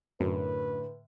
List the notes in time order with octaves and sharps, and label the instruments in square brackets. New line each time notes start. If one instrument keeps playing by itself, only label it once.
[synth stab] F#2 [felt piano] A2 D3 [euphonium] B4